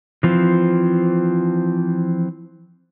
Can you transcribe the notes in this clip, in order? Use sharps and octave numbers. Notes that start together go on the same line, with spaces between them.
E3 F3 C4